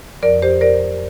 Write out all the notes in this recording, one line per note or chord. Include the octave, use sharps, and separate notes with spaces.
F2 F3 A#4 D5
G4 C5
A#4 D5